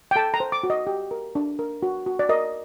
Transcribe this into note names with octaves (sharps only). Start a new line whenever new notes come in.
G5
A4 A5
A#5
C5
D6
F#4
D#5
G4
A#4
D4
A#4
F#4
F#4
D5
A#4 D#5